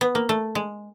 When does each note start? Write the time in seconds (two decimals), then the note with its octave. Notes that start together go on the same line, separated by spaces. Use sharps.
0.01 B3
0.15 A#3
0.29 A3
0.55 G#3